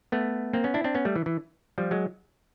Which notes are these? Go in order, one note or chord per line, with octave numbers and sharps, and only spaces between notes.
A3 B3
A#3 C4
B3 C#4
D4 E4
C4 D4
B3 C#4
G3 A3
E3
E3
F3 G3
F#3 G#3